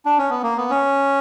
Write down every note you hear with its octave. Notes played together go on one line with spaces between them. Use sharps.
D4
C#4
B3
A#3
B3
C#4